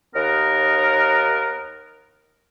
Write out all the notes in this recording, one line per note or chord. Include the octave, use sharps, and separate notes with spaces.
D#2 B3 D#4 A#4